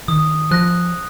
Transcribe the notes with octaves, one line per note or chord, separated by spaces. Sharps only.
D#3 D#6
F3 F#6 A#6